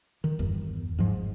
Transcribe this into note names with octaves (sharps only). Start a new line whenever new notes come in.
D#3
G1 E2
G#2 F3